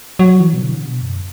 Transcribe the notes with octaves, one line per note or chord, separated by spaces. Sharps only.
F#3
E3
B2
D3
B2
F#2